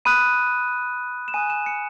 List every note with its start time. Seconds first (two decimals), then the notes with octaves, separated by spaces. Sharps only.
0.05 B5 D#6 F#6 D#7
1.28 E7
1.34 G#5 D#6 F#6 D#7
1.50 E7
1.66 C#7